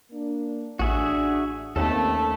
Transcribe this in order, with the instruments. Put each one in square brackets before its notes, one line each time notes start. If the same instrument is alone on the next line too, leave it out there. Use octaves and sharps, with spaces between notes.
[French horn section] A#3 D4
[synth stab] A1 [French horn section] D4 [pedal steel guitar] F#4 G#4 E5
[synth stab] D#2 [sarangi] A3 [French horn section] C4 C#4 [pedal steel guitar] A4